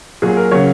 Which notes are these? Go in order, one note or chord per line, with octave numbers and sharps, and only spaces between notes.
A#2 F#3 G#4
A#4
C#3 F#3 C#5